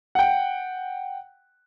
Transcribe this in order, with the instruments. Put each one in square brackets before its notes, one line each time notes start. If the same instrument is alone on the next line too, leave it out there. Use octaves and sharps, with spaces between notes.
[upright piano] F#5 G5